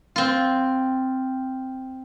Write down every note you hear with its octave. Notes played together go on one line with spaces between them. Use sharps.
C4 F4